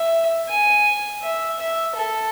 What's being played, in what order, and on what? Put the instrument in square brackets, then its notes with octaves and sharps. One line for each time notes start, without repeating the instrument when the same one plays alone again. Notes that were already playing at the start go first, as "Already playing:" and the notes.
Already playing: [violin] E5
G#5
E5
E5
A4